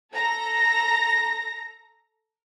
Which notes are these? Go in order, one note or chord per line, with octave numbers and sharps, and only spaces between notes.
A4 A#5 A#6